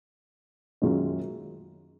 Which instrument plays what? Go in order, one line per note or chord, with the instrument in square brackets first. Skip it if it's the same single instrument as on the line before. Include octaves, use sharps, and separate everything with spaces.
[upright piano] F#2 D#3 G#3 C#4 F4